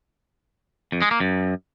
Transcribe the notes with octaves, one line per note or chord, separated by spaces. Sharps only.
F2
G#3
A#3
F#2